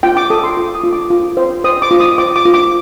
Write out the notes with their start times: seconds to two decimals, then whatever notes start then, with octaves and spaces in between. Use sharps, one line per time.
0.03 F4 G5
0.17 D6
0.30 A4 D#6
0.44 C6
0.57 F4 D6
0.75 D#6
0.84 F4
0.93 D6
1.10 F4
1.37 C5
1.64 C5 D#6
1.82 D6
1.91 F4
2.00 D#6
2.18 C5 D6
2.36 D6
2.45 F4
2.54 D6